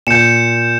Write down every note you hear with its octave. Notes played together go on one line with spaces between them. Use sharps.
A#2 G6 C#7 E7